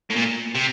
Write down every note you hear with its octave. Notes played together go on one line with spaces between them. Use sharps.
A2
A#2
C3